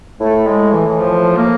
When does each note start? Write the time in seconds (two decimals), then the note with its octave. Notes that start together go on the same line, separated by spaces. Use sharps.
0.21 A2 A3
0.47 G#3
0.72 E3
0.88 E3
0.99 F3
1.37 A#3